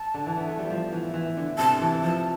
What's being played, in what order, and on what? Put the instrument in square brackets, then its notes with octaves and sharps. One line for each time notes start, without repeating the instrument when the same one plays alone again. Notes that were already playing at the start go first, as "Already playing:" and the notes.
Already playing: [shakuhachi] A5
[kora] D3
E3
B3
A3
G3
F3
E3
E3
D3
[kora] C3 [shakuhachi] A5
[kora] E3
[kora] F3 [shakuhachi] A5